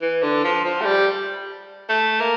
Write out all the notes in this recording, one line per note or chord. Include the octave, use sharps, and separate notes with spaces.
E3
D3
F3
F3
A3
G3
A3
A#3